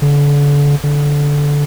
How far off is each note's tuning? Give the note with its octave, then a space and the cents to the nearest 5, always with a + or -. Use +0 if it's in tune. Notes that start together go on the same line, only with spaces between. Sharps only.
D3 -35
D3 -15